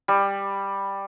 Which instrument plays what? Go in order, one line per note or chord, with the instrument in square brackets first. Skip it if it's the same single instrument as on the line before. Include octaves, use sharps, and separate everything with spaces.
[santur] G3